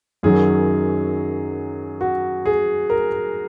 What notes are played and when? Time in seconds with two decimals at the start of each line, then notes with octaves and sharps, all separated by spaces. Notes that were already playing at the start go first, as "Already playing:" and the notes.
0.23 F#2 D#3 F#3 G#4
2.01 F#4
2.45 G#4
2.90 A#4